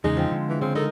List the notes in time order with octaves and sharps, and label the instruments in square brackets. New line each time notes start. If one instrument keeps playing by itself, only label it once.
[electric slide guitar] E2 C#3 G#4 [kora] G#3 [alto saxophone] D#4
[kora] F3 C4
[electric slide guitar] D3 G#3
[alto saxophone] E3
[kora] C#3 [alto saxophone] C4
[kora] D#4 A#4 [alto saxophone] A4